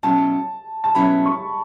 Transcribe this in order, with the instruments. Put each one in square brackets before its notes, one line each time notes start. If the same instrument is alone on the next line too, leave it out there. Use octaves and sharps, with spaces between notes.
[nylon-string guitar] B2 F#3 C#4 E4 [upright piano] A5
[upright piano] A5
[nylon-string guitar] B2 F#3 C#4 E4 [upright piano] B5
[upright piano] C#6